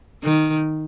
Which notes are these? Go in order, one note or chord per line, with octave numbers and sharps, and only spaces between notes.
D#3